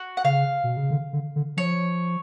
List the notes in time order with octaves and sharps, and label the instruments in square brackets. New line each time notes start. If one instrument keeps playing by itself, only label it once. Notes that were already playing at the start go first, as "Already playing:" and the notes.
Already playing: [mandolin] F#4
F#5
[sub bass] C#3 [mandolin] F5
[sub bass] B2
C#3
D3
D3
D3
[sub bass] F3 [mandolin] C#5